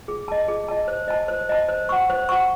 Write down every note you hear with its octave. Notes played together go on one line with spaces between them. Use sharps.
G#4
D#5 A5
G#4
D#5 A5
C5
D#5 A5
C5
D#5 A5
C5
F#5 C#6
C5
F#5 C#6